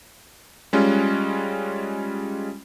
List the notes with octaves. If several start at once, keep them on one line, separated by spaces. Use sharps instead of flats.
G3 G#3 C#4 F4